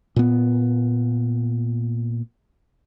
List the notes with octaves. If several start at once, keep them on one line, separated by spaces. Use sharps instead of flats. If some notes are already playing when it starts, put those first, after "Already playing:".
A#2 B3